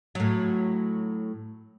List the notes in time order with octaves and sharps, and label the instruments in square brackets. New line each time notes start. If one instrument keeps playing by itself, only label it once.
[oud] A2 F#3